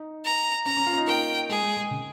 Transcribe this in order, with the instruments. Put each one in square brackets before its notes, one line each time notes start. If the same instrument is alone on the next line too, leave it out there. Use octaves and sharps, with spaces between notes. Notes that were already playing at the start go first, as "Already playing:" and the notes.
Already playing: [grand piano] D#4
[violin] A#5
[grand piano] C#4 [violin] A#5
[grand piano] C#4
F4
C#4
D#4
[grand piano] A#3 [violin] G5
[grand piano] G#3 [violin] G#4
[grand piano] G#3
G#3
C#3